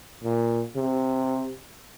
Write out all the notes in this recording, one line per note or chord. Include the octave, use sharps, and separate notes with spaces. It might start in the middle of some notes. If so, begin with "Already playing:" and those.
A#2
C3